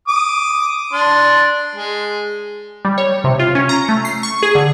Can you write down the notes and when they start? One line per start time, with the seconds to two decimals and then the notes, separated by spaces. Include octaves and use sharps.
0.08 D6 D#6
0.93 D4 C6
1.75 G#3
2.85 G3
2.98 C#5
3.24 C3
3.39 F4
3.55 C#4
3.69 A#5
3.89 A3
4.05 C7
4.23 C#6
4.43 G#4
4.55 D3